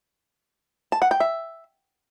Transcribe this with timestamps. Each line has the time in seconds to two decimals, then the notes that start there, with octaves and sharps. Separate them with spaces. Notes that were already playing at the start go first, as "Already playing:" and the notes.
0.92 A5
1.02 F#5
1.11 G5
1.20 E5